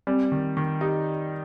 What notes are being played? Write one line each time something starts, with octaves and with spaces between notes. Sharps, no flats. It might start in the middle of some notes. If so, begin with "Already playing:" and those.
G3 C4
D#3
D#3
D#4 G4